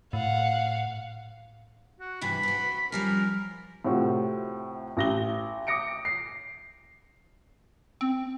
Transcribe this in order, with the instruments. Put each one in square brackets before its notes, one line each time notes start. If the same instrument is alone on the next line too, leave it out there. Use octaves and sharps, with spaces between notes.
[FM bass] A2 [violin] F5 F#5
[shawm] F#4
[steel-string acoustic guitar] G2 C3 E3 [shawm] B5
[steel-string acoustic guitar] C4 F#4
[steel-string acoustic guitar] F3 G3 C#4 [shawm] A#4
[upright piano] A2 C3 C4 F4 F#4
A1 A#6 G7
D6 D#6 A#6 C#7 D7
C7
[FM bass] C4